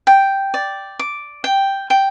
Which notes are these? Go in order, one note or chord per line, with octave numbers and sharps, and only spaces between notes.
G5
D5
D6
G5
G5